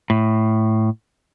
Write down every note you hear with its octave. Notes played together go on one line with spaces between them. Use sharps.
A2